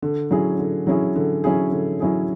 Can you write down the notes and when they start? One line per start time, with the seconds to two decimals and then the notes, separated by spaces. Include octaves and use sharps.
0.02 D3
0.31 F#3 C#4 E4 G#4
0.59 D3
0.87 F#3 C#4 E4 G#4
1.16 D3
1.44 F#3 C#4 E4 G#4
1.72 D3
2.00 F#3 C#4 E4 G#4